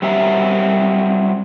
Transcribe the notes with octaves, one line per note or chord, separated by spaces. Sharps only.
F#3 G3 C4 F#4 E5 A#5